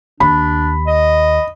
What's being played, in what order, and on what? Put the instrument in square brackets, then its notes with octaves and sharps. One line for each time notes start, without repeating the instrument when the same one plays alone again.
[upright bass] D#2 [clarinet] D4 [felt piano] B5
[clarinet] D#5